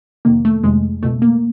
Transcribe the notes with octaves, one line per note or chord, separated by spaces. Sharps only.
F2 C3 D#3 A#3
A3
F2 C3 D#3 G#3
C#2 B2 A3
A#3